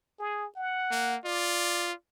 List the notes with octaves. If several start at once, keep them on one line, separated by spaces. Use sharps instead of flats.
G#4
F#5
A#3
F4 D5